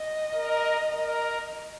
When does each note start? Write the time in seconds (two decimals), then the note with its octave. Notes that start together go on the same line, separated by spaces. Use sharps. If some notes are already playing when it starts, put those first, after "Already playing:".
Already playing: D#5
0.34 A#4
0.95 A#4